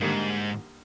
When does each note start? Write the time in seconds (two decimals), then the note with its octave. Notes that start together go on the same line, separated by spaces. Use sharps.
0.01 G#2 D3 G3 A#3 D#4